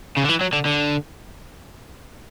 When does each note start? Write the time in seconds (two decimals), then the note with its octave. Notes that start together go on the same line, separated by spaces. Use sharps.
0.17 C#3
0.24 D3
0.29 E3
0.41 F#3
0.53 D3
0.65 D3